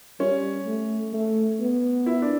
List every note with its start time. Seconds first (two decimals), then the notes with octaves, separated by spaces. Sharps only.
0.20 G3 C#4
0.66 A3
1.13 A3
1.60 B3
2.06 E4
2.22 D4